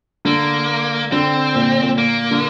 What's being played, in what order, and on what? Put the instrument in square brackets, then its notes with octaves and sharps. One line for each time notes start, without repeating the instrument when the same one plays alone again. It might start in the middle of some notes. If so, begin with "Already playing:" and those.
[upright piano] D3 [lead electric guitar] A#3
[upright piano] D3 [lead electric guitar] C4
[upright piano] A#2
A#2
[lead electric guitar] A#3
[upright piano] D3